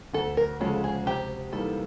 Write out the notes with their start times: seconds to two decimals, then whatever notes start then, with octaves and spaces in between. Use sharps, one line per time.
0.14 D2 A4
0.37 A#4
0.60 C#3 F3 G#3 C#4 A4
0.84 G#4
1.06 C3 G4
1.52 E3 G3 A#3 D#4 A4